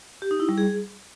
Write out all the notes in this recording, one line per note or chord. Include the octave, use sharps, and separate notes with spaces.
G4
D#4
E4
G3
G#4